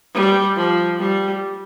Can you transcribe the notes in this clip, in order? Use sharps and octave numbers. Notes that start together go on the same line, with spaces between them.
G3
F3
G3